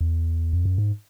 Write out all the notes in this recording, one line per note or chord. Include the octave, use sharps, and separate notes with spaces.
E2
F2
F#2
G#2